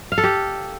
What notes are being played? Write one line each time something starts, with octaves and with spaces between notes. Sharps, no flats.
F5
A4
G4